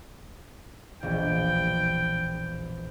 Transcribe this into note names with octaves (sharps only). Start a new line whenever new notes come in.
E1 A#1 G5